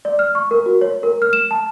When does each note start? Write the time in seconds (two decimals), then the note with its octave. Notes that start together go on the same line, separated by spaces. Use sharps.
0.05 D5
0.19 F6
0.35 C#6
0.51 A#4
0.66 F#4
0.81 C#5
1.03 A#4
1.22 F6
1.33 E7
1.51 A5